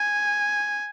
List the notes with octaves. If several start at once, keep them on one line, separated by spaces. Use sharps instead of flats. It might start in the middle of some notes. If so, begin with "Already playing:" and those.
Already playing: G#5